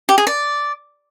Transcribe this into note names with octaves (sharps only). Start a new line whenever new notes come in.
G4
G#4
D5